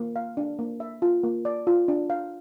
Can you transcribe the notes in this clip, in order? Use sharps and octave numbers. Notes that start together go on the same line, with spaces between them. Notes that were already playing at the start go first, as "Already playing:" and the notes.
Already playing: A#3
F5
D4
A#3
E5
F4
A#3
D5
F4
D4
F5